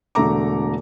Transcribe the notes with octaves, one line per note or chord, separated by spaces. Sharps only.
E1 D3 A3 A4 A#5 D6